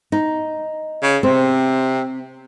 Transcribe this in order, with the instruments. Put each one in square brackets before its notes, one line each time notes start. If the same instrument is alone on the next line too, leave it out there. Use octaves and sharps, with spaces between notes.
[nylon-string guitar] D#4
[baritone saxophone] C#3
[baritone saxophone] C3 [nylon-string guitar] C4